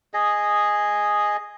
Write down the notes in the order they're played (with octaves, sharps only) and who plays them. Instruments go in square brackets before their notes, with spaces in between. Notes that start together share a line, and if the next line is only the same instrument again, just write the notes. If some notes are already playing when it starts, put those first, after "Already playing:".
[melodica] G#4 D#5